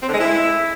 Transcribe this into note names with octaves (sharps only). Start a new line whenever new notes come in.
C4
D3
G#3
E4